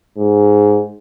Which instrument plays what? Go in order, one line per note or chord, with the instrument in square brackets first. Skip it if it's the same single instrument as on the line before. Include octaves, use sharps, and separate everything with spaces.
[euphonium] G#2